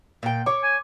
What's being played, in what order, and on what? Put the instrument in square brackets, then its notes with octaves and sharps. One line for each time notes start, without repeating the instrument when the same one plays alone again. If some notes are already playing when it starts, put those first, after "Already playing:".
[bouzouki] A#2 G5
[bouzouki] C#5 [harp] D6
[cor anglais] G#5